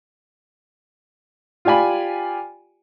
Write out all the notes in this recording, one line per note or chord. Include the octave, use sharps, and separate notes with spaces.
F4 G4 D5 G#5 B5